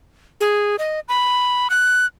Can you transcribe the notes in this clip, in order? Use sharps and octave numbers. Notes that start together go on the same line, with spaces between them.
G#4
D#5
B5
F#6